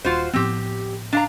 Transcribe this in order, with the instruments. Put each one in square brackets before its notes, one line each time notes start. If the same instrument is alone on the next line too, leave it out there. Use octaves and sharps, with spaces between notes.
[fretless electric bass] D#1 [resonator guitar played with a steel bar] F4 F#4 C5
[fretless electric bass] A2 F3 B3 [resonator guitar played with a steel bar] C4 G4
[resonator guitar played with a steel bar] D4 F5 A#5